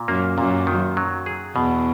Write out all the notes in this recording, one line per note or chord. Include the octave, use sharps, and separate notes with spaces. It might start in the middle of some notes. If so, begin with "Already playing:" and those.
Already playing: A#2
F#2 A#3
F#2 A#2
D#3
F#3
G#4
E2 B2